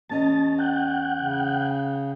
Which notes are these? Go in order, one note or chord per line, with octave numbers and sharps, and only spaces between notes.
E2 C#4 D#5 A5
F#5 G5
C#3